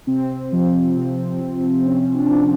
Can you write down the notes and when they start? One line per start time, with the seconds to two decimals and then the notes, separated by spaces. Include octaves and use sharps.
0.07 C3 C4
0.52 F3
0.97 C3
1.41 F3
1.85 C3 C#4
2.15 D4
2.30 F3